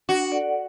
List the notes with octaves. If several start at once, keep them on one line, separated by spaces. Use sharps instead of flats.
D4 F#4
A4 D5 F#5